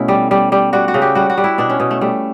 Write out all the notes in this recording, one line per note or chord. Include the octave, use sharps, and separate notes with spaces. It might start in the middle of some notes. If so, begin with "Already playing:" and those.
Already playing: B2 A3 C#4 E4
G3
G3
G3
G3 F#4
F#4
C#3
G4
G3 F#4
F#4
G3
E4
B2 D4
C#4
B2
A3
G3 A3